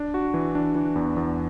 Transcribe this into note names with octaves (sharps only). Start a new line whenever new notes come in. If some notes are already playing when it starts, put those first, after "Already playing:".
Already playing: D4
F#4
E3
D4
E3
E2
E2